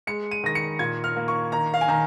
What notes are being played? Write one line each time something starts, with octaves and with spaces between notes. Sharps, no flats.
G#3 C#7
D#7
D#3 A#6
C#7
A#2 G#6
F6
A#3
C#6
D#3 A#5
F5
G#5
D#3 A#5